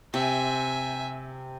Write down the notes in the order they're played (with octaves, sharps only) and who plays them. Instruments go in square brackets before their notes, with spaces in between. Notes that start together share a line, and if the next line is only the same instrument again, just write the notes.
[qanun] C3 [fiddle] E5 G#5